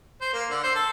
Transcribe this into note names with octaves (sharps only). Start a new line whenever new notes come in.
C5
A#3
D3
C5
A4